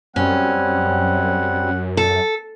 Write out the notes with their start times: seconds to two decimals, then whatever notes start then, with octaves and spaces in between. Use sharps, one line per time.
0.16 F#2 G3 C4 C#4 F#5
1.97 A4